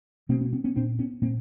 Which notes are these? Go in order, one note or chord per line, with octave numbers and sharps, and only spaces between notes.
B2 A#3 C4
B3 C#4
B3 C#4
B3 C#4
A#2 C4 D4
B3 C#4
A#2 A#3 C4